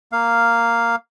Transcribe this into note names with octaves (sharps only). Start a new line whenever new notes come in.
A#3 F5